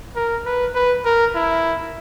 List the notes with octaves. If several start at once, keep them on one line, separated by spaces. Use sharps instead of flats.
A#4
B4
B4
A#4
E4